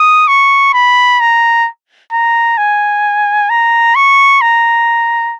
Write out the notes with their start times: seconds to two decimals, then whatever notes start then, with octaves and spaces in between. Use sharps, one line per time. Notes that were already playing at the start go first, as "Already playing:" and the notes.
Already playing: D#6
0.28 C#6
0.74 B5
1.20 A#5
2.12 A#5
2.58 G#5
3.50 A#5
3.95 C#6
4.41 A#5